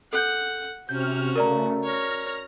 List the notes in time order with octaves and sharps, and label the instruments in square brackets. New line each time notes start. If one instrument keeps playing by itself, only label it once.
[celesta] A4 F#6 G6 [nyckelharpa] F#5
[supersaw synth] C3 F6 [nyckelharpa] C#4 F#4 [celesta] G6
[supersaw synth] C#3 A3 [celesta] A#4 D5 A#5
[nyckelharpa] C#5 [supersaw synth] F6 A#6